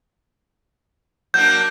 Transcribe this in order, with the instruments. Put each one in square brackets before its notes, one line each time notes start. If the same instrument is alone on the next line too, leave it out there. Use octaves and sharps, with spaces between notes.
[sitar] F#3 A#3 D4 [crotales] G6